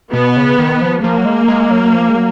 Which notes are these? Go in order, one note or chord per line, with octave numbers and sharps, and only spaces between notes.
B2 B3
C#3
D#3
F3
F3 A#3
F#3
G#3
G#3
F#3
F3
G#3
F#3